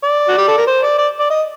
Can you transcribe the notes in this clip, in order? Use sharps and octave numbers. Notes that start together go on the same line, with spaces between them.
D5
F#4
G4
A4
A#4
C5
D5
D5
D5
D#5